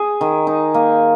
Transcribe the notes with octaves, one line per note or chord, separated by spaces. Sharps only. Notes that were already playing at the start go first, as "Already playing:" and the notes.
Already playing: G#4
D#3
D#4
A#3